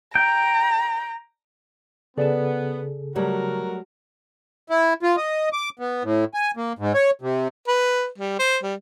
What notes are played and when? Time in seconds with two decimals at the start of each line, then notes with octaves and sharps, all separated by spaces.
0.15 G5 A#5
2.17 C#3 B3 G#4 A4 D5 A5
3.16 F#3 G3 A3 F#4 A#4 C#5
4.70 E4
5.03 F4
5.17 D#5
5.53 D6
5.79 B3
6.04 A2
6.34 G#5
6.57 A#3
6.79 G#2
6.94 C#5
7.22 C3
7.68 B4
8.18 G3
8.39 C5
8.63 G3